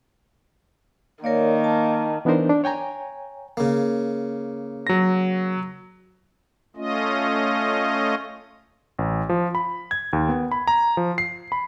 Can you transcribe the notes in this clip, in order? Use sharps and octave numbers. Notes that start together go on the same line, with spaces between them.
D#3 A#3 A#4 C#5 D5
A5
E3 B3 D4 D#4 A#4 C5
D4
C#5 G5 G#5 A#5
C#3 A#3
F#3 A#6
A3 C#4 F4 D#5
A1
F3
B5
G#6
D#2
B3
B5
A#5
F3
C7
B5